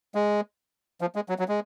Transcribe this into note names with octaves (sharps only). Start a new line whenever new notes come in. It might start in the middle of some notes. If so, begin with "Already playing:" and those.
G#3
F3
G#3
F#3
F#3
G#3